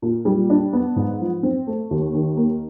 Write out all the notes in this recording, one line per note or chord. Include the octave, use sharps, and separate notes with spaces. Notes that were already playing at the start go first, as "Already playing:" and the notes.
A#2
G3
D4
B3
G#2
F3
C4
A3
D#2
D#3
A#3